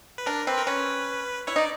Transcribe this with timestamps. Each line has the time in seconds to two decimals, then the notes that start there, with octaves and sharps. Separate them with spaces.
0.18 B4
0.26 D4 A#4
0.47 C4 B4
0.58 A#4
0.67 C#4 B4
1.47 E4 C#5
1.56 D#4 D5